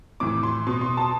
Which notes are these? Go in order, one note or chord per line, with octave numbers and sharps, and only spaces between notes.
A2 E3 D6
C6
B2 C6
C6
A5